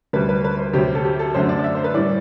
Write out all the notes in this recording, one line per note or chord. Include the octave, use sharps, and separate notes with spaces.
D2 C3 G3 B4
B4
B4
C5
D2 C3 F#3 G4
A4
G4
A4
F#2 D3 A3 C5
D5
D5
E5
C5
B4
A2 E3 G3 D5